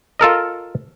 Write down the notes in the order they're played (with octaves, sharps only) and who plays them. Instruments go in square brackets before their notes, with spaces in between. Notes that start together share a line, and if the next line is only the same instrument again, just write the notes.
[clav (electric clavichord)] F4 A4 A#4 D#5